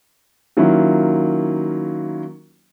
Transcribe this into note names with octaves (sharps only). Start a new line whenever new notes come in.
D#3 F#3 A#3 C#4 E4 F4